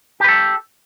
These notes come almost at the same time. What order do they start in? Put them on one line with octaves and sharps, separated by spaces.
G4 B4 A4